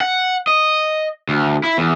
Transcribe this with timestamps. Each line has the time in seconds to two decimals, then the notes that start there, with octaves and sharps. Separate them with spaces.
0.01 F#5
0.47 D#5
1.29 D2
1.64 E4
1.78 E2